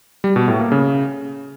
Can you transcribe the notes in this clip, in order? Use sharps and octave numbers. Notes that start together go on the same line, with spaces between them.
G3
B2
A2
A#3
C#3